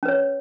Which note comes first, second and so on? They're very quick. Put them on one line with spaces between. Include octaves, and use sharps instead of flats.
C#4 B4 C#5